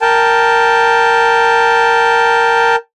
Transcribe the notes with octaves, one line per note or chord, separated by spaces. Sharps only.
A#4 G5 A5